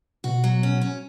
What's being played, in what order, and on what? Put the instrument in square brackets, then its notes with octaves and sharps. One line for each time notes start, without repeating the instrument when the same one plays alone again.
[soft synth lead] B2 [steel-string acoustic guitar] F#4
[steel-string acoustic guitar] F#3
C#4
C#4